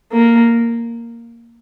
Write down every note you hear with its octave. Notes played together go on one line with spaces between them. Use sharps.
A#3